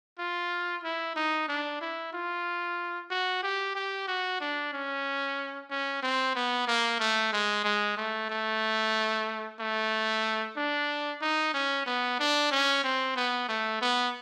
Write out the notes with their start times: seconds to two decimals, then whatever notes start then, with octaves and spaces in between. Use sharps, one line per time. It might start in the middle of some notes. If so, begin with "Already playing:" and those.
0.19 F4
0.84 E4
1.16 D#4
1.48 D4
1.81 E4
2.13 F4
3.10 F#4
3.43 G4
3.75 G4
4.08 F#4
4.41 D4
4.73 C#4
5.70 C#4
6.03 C4
6.35 B3
6.68 A#3
7.00 A3
7.32 G#3
7.64 G#3
7.97 A3
8.30 A3
9.60 A3
10.57 D4
11.21 D#4
11.54 C#4
11.86 B3
12.19 D4
12.51 C#4
12.84 C4
13.16 B3
13.48 A3
13.81 B3